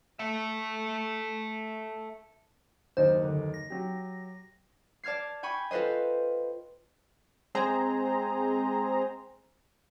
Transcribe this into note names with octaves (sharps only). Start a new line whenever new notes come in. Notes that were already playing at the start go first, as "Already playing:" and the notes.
A4 E5
F#1 D#2 D#4 C5
D3
A#6
F#3 G4
D5 A5 F6 G#6 C7
G5 G#5 B5 C#6
F4 A4 B4 C5 D#5
G#3 C4 G#4 C5 A#5